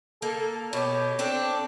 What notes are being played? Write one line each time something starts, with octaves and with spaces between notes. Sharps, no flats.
A#3 A4
B2 G4 C#5
C4 D4 A4